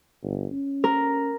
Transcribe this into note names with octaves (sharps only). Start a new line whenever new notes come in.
G1
C#4
A#4